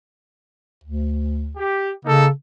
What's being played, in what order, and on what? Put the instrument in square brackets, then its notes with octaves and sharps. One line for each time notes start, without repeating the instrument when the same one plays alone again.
[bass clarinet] D2
[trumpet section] G4
[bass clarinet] C#3 [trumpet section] A#3 D#4 A4